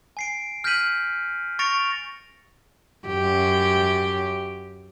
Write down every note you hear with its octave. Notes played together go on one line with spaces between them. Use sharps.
G#5 C7 D7
F6 G6 A#6 B6 D#7 F#7
C#6 A6 A#6 C#7 D7 F7
F#2 G4